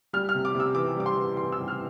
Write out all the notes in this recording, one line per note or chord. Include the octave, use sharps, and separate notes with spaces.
G3 F6
F6
C3
D6
C3
E6
E3 D6
G3 D6
C6
E3
E3 C6
E6
G3
F6